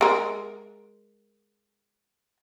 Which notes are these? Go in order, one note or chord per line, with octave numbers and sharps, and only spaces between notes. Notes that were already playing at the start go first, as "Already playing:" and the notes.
G#3 A#4